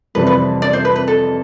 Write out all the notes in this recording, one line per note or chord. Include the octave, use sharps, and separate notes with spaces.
F2 C3 E3 G3 C4 B4
B4
D5
C5
B4
B4
A4